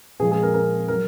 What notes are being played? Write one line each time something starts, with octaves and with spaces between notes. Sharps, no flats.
A#2 F3 G#3 G#4
G#4
A#4
A#4
F#3 A#4